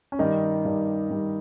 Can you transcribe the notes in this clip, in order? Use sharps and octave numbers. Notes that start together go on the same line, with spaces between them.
C#4
G2 D#3 G3 D#4
G2 D#3 G3
G2 D#3 G3